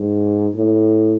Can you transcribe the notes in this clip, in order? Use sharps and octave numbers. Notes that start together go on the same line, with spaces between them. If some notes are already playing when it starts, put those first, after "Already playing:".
Already playing: G#2
A2